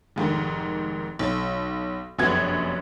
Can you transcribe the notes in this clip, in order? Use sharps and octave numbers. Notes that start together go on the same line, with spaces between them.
F1 G#2 D#3
B1
F1 A#1 F#2 B3 F#4 G#6